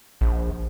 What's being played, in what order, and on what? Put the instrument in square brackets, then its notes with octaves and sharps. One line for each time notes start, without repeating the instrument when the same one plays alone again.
[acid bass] A#1